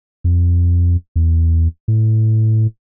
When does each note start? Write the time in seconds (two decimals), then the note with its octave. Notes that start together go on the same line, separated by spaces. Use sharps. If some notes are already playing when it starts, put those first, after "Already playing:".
0.24 F2
1.16 E2
1.88 A2